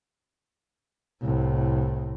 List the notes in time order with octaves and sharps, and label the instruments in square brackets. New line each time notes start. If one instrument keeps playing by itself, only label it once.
[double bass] C2 A2